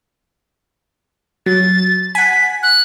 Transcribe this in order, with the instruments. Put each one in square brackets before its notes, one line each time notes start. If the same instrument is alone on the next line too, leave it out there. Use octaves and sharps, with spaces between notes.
[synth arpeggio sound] F#3 [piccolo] A6
[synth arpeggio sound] F#5 G#5 [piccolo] B6
[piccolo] F#6